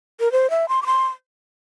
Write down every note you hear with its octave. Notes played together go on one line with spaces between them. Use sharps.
A#4
C5
E5
C6
D6
C6